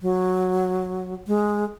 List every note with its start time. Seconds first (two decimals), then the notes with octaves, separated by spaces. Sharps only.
0.02 F#3
1.27 G#3